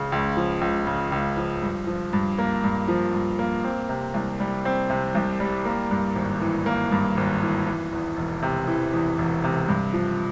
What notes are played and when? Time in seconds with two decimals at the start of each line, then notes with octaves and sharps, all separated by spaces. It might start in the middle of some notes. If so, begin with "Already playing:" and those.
Already playing: C#2 C#3
0.12 C#2
0.37 F3
0.61 C#2
0.87 C#3
1.12 C#2
1.37 F3
1.62 G2
1.87 F3
2.13 G2
2.39 A#3
2.64 G2
2.88 F3
3.14 G2
3.39 A#3
3.64 C4
3.89 C3
4.14 C2
4.40 G3
4.65 C4
4.90 C3
5.15 C2
5.40 G3
5.65 A#3
5.91 G2
6.16 G#1
6.41 E3
6.66 A#3
6.92 G2
7.17 G#1
7.42 E3
7.67 E3
7.93 E2
8.17 E1
8.43 C3
8.67 E3
8.93 E2
9.18 E1
9.44 C3
9.68 G2
9.93 F3